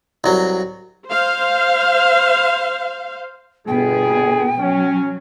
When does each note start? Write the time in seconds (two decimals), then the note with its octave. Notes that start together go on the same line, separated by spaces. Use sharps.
0.24 C2 F#3
1.07 C5 F5
3.68 G1 B2 B3 G#4 G5
4.59 F#3 C#4